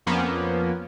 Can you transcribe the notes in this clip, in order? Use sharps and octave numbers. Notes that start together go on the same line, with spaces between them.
F2 F3 A#3 B3 C#4